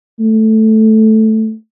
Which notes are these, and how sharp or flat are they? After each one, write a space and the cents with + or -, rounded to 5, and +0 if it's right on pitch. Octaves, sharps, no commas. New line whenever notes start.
A3 -5